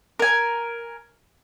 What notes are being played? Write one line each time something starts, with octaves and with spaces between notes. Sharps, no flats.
A#4 G#5